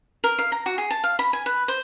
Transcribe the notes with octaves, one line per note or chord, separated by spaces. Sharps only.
A#4
F5
A#5
F#4
G#4
A5
F5
B5
G#5
B4
C5